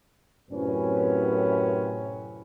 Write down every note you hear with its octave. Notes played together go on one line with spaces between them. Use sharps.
F#2 A2 C3 C4 C#4 B4